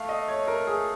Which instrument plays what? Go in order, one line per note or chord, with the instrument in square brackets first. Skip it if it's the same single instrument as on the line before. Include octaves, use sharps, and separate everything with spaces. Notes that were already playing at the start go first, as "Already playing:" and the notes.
Already playing: [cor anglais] A3 [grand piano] F5
[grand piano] D#5
C#5
A#4
G#4